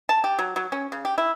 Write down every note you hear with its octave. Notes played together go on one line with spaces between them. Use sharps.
A5
G4
F#3
F#3
C#4
C#3
G4
E4